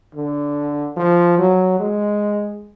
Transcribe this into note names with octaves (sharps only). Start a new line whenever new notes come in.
D3
F3
F#3
G#3